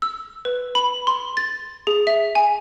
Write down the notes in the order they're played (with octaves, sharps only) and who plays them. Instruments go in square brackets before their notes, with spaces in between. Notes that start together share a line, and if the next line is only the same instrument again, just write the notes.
[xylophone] E6
B4
B5
C6
A6
G#4
E5
G#5